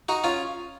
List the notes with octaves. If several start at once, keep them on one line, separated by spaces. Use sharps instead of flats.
D#4 F#4
C#4 F4